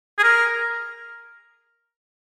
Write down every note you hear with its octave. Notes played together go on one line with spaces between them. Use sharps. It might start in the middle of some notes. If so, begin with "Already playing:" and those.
G#4
A#4